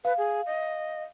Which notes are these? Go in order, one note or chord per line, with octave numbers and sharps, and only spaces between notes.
B4 F5
G#4
D#5